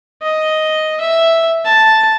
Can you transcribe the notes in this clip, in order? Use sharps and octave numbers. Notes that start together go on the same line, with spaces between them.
D#5
E5
A5